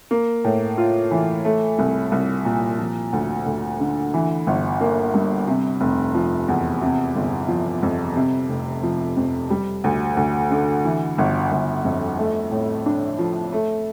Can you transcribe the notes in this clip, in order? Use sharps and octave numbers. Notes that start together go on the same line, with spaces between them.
A#3
A2
F4
E3
A3
C2
C2
A#2
F3
D2
D2
D3
E3
G1
A#3
G2
C3
F1
F3
E2
C3
G1
F3
F2
C3
F1
F3
F2
G3
D2
D2
D3
E3
G1
G1
F2
A3
A2
D4
F3
A3